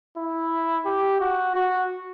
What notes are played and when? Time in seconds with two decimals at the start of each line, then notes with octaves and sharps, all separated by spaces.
0.16 E4
0.85 G4
1.20 F#4
1.55 F#4